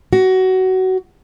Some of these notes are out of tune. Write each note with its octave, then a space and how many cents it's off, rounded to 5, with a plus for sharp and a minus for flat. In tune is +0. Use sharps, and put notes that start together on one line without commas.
F#4 +20